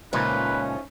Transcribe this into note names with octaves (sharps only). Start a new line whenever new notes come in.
C#2 A#2 F3 A3 C#4 D#4 B4